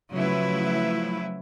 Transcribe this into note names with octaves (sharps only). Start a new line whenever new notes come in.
C#3 F3 F#3 A3 E4 B4